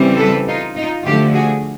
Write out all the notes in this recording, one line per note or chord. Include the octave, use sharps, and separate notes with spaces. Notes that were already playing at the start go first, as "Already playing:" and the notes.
Already playing: C#3 E3 G3 C4
A4 B4
D#4 F4
D#4 F4
D3 F3 A3 F4 G4
F#4 G#4